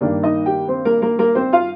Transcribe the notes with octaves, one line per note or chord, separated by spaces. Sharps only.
G2 D#3 A#3 D4 D5
D#4 D#5
G4 G5
C4 C5
A#3 A#4
A#3 A#4
A#3 A#4
C4 C5
F4 F5